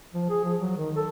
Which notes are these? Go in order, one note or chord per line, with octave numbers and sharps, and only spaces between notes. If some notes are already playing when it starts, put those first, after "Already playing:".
F3
G#4
F3
F#3
D#3
A4